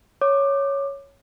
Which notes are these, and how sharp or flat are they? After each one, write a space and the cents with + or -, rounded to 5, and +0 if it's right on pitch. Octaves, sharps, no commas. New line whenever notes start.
C#5 +0 D6 +20